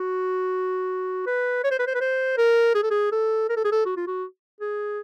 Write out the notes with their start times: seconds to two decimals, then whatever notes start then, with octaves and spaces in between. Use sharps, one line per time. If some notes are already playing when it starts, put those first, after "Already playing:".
Already playing: F#4
1.26 B4
1.64 C#5
1.71 C5
1.79 B4
1.87 C5
1.95 B4
2.01 C5
2.38 A#4
2.75 G#4
2.83 A4
2.91 G#4
3.12 A4
3.50 A#4
3.57 A4
3.65 G#4
3.72 A4
3.86 F#4
3.97 F4
4.07 F#4
4.61 G#4